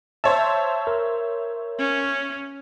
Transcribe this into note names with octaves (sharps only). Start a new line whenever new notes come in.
C5 C#5 E5 A5
A#4
C#4